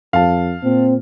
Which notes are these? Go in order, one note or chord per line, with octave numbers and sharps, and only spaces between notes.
F2 F5 A5
A#2 C4